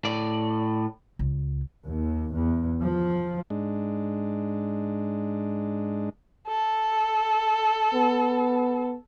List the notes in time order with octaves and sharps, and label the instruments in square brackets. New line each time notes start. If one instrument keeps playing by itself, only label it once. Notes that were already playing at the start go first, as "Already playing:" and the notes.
[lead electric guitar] A2 D5
[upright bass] C#2
[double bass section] D#2
E2
F3
[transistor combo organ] G#2 G#3 D4
[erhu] A4
[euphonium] B3